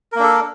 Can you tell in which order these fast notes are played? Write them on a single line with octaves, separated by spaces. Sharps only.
A#4 A#3 D4 A4